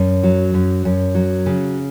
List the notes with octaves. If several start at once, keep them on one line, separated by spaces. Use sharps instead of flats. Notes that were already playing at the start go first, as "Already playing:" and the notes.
Already playing: F#2
F#3
F#2
F#2
F#3
C#3